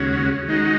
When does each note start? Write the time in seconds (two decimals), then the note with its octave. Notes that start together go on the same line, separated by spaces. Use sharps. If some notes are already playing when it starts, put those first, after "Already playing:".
Already playing: D#2 C#3 G#3 C#4 F#4
0.48 D#3 G#3 D#4 F#4